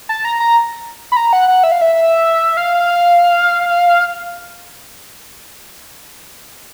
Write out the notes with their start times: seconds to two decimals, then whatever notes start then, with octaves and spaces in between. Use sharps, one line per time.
0.09 A5
0.25 A#5
0.40 A#5
1.12 B5
1.17 A#5
1.33 F#5
1.48 F#5
1.64 E5
1.72 F5
1.81 E5
2.57 F5